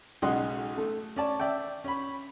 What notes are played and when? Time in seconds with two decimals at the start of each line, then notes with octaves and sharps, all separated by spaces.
0.22 B1 C#3 G#3 D#5 F#5 C6
0.77 A3
1.16 C#4 D5 A5
1.40 D5 E5 G5
1.84 C#4 B5